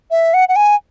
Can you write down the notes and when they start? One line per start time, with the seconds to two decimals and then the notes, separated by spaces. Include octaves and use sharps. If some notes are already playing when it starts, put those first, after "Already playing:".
0.11 E5
0.34 F#5
0.49 F#5
0.56 G#5